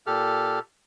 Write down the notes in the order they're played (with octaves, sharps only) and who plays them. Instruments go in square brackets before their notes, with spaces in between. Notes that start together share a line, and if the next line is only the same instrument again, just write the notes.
[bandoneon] A#2 G4 A4 F6